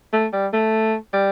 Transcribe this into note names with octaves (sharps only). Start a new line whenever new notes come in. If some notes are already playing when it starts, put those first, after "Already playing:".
A3
G3
A3
G3